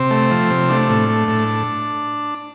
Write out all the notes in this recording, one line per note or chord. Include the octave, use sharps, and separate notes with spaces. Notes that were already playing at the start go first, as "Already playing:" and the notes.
Already playing: C3 C4
A3
F3
C3
A3 D4
A2
A3
A2